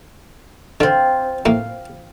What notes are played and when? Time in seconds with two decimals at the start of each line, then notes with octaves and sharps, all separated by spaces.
0.80 D3 C4 F4
1.46 A2 A#3 F5